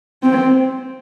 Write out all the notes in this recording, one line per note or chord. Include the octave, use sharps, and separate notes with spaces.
C4